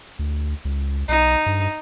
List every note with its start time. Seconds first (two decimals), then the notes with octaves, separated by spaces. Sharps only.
0.19 D2
0.65 C#2
1.08 B1 D#4
1.46 G2